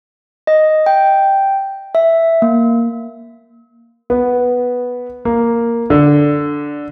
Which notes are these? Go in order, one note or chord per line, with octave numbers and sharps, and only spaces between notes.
D#5
G5
E5
A#3
B3
A#3
D3